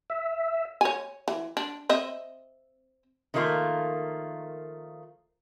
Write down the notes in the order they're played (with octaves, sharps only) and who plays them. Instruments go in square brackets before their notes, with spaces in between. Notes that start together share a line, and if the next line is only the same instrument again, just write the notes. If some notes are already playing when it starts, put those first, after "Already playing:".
[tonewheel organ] E5
[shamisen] C#5 G#5
E3
D4
C4 D#5 E5
[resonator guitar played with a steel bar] D#3 F3 A3 A#3 F4